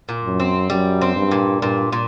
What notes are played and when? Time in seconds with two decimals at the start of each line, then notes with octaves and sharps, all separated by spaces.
0.09 A#2
0.24 F#2
0.40 C4
0.70 F#2 G3
1.01 C4
1.16 G2
1.31 A#2
1.62 G2 A#2
1.92 A#2